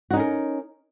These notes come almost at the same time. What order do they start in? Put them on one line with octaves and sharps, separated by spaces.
F#4 D#4 C#4 A#4